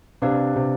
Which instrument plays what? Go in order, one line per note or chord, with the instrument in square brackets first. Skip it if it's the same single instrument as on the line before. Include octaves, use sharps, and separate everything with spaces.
[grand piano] C3 [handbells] D4 G4 B4 D5 F5
[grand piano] C3